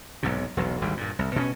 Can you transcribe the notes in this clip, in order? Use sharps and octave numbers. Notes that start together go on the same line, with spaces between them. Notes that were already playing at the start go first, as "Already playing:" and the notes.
B1 G#2 C3
E1 B1
G#1 D2 G3
G2 A#2
C2
B2 B3 C#4